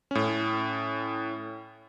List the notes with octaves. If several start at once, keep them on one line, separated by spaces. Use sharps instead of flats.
A2 C#4